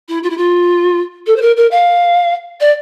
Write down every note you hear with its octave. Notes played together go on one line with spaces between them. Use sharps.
E4
F4
E4
F4
A4
C5
A#4
A#4
F5
D5